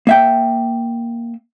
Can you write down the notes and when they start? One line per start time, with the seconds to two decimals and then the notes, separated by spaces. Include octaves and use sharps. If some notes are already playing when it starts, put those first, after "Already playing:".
0.07 A#3 E5 G5